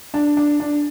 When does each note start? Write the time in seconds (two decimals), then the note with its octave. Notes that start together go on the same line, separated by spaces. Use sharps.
0.14 D4
0.37 D4
0.60 D4